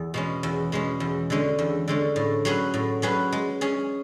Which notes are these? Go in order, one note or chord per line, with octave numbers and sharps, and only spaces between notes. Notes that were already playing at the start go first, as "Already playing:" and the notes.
Already playing: E2
B2 G#3 C#4
E2
B2 G#3 C#4
E2
D3 G#3 C#4
E2
D3 G#3 C#4
A2
F#3 C#4 G#4 B4
A2
F#3 C#4 G#4 B4
G#3
C#4 G#4